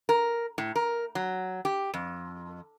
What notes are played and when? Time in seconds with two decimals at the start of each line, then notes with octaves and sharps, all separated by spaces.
0.09 A#4
0.58 A2
0.76 A#4
1.15 F#3
1.65 G4
1.94 F2